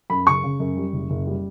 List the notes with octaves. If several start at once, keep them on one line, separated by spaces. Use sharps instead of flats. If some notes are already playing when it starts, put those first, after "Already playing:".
F#2 B5
C#3 C#6
C#3
F#2
G3
F#1
F#1
G3